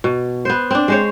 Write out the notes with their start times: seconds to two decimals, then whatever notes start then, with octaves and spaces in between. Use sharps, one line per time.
0.04 B2
0.45 B3 C5
0.71 C4 D4
0.88 G#3 C5 C#5